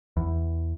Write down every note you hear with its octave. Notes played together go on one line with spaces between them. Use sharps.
E2